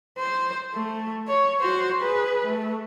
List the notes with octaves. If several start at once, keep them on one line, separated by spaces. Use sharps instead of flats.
C5
A3
C#5
F#4 C5
G#4 B4
A3